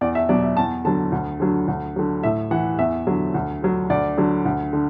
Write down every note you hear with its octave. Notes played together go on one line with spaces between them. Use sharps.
E2 D5
E5
B2 F#3 D5
E5
E2 A5
D3 F#3 A5
D2
D3 F#3
D2
D3 F#3
A2 E5
E3 F#5
E2 E5
D3 F#3
D2
D3 F#3
D2 D5
D3 F#3
D2
D3